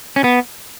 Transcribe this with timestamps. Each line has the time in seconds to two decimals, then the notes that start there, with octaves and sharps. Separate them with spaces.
0.16 C#4
0.24 B3